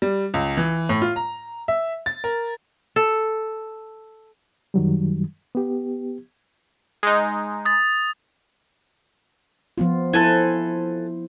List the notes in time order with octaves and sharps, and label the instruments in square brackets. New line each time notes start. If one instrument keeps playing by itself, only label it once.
[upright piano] G3
C#2
E3
A2
F4
A#5
E5
A6
A#4
[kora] A4
[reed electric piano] F#2 D#3 F#3 G3
B3 G4
[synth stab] G#3 D#4
[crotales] D#6 A6
[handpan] F3 B3 F4
[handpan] E4 C5 [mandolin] A4 B4 G#5